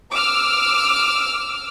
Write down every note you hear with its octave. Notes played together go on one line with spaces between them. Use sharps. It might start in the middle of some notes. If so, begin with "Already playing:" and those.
D6 E6 F6